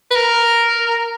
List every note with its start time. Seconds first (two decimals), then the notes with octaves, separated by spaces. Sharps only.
0.11 B4
0.16 A#4